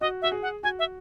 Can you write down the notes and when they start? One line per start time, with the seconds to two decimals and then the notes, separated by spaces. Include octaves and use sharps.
0.01 F#4 D#5
0.22 F#4 E5
0.32 G#4
0.42 F#5
0.63 F#4 G#5
0.79 E5